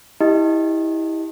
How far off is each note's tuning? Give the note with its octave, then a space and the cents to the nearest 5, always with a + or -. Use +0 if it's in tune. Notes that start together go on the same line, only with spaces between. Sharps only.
E4 -25 G4 +15 D#5 +0